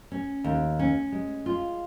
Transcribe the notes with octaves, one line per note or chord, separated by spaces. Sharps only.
C#4
D#2
C#4
G#3
F4